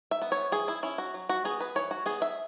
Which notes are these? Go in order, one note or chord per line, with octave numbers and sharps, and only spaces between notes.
E5
B3
C#5
E3 G#4
E4
C#4 E4
F#4
F#3
F#4
B3 G#4
B4
E3 C#5
F#4
B3 G#4
E5